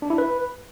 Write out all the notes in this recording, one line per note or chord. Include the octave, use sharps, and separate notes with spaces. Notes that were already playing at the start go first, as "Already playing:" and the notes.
D4
E4
B4